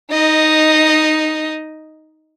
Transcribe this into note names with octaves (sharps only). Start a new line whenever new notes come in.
D#4 D#5